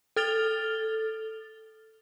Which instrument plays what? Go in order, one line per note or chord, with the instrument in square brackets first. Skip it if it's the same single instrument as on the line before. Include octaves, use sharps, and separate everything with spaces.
[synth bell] A4 F6 A6 F7 G7